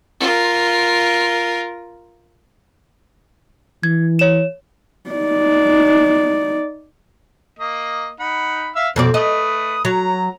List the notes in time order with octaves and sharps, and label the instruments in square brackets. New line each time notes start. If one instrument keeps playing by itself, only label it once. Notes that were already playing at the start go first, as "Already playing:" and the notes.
[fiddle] F4 A#4
[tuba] E3 [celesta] G#6
[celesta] C#5 E7
[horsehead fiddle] D#4 D5
[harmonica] A#3 D#5
D#4 F#5 B5
E5 F5 E6
[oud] F2 B2 D5 [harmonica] C4
[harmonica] A3 B4 D#6 [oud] D#5
[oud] F#3 [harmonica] A#5